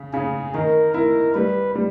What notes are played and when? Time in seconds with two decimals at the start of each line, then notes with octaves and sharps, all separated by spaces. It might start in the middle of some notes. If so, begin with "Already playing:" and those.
Already playing: C#3
0.13 C#3 G#4
0.54 D#3 A#4
0.94 E4 A#4
1.34 G3 B4
1.75 G3